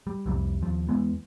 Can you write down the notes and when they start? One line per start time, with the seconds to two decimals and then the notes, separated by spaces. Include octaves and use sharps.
0.07 G3
0.26 C2 F2 C3 G3
0.62 D#2 F3
0.89 E2 E3 G#3 B3